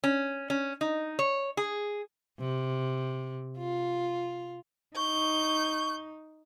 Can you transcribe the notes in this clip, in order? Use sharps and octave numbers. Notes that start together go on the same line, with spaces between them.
C#4
C#4
D#4
C#5
G#4
C3
F4
D#4 C#6 G6